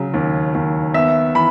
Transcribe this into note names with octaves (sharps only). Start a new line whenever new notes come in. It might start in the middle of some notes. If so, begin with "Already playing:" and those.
Already playing: C#3 F#3
D#2
D#2
B3 E5
E3 B5